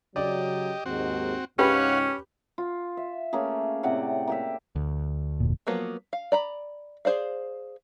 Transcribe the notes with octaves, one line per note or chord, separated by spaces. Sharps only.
C#3 F#3 G4 D5 D#5
D#2 G#2 C4 F#4
C#2 G#2 C#4 G4 B4 C#5 F5 F#5
F4
E5
A3 A#3 C#4 G#4
A2 C3 D5 F#5
A#3 G4 E5
D2
F1 A#2
F3 F#3 A#3 B3
F5
D5 A#5 B5
G#4 C5 D5 F5